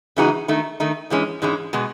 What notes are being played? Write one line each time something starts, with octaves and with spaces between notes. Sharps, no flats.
C#3 E3 G#3 D#4 F#4
D#3 A3 D#4
D#3 A3 D#4
G#2 E3 G#3 C#4
G#2 E3 G#3 C#4
B2 G#3 B3